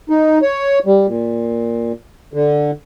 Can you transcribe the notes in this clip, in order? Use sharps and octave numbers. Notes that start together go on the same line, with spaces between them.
D#4
C#5
G3
A#2
D3